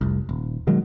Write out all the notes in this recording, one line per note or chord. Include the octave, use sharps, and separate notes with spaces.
F1 C2
D#1
B2 D#3 F#3 G#3